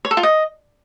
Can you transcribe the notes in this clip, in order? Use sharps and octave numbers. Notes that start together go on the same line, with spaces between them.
C#5
A4
F4
D#5